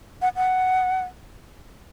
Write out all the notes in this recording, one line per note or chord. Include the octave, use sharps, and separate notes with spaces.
F#5
F#5